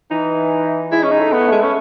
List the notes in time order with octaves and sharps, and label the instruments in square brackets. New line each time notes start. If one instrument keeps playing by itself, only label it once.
[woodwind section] E3 [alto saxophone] D#4
[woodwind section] G#3 [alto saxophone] E4
[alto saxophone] C#4
D#4
[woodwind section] A3
[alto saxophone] B3
[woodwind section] A3
[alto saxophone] G#3
C#4